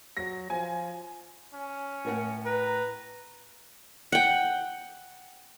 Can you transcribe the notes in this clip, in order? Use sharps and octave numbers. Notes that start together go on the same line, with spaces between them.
F#3 A#6
F3 G#5
C#4
A2 A#4 F#5
B4 A#5
F#5 G5